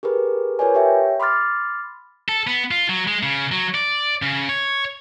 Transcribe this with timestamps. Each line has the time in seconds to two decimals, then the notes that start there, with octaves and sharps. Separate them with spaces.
0.03 G4 G#4 A#4 B4
0.59 F4 A#4 B4 C#5 D5 G#5
0.74 G4 C#5 E5 G5
1.20 B5 C6 D6 F6 A6
2.29 A4
2.47 B3
2.71 F4
2.89 F#3
3.07 G#3
3.23 C#3
3.52 F#3
3.74 D5
4.22 C#3
4.49 C#5